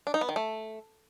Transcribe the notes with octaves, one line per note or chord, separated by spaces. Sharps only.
D4
D#4
B3
D#3
A3